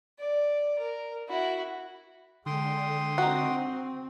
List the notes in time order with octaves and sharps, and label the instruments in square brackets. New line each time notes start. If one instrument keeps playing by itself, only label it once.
[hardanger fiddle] D5
A#4
E4 F#4
[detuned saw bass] D3 [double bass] G#3 [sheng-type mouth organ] G5 C6 D#6
[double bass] C4 [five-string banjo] D#4 F#4